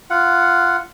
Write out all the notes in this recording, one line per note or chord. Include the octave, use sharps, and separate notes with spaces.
F4 F#5